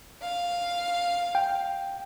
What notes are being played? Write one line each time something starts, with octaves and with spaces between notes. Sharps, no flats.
F5
G5